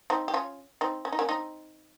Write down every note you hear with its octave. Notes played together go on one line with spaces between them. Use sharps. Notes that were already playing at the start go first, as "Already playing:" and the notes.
C4 D#4
G4
C#4 F4
C4 D#4
C#4
D#4
A#3 C#4
C4 D#4